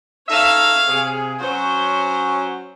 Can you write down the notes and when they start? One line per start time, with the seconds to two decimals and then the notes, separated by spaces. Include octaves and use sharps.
0.29 D#4 A4 C#5 E5 F5
0.88 C3 G#4
1.40 F#3 C#4 F#4 C5